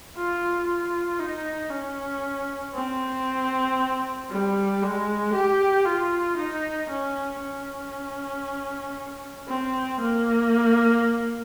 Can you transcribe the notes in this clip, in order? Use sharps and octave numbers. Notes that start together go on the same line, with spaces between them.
F4
F4
D#4
C#4
C4
G3
G#3
G4
F4
D#4
C#4
C#4
C4
A#3